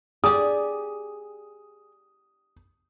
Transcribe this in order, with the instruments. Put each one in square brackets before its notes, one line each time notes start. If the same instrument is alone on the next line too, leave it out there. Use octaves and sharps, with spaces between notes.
[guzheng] G4 D5 [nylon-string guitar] G#4 [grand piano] D#6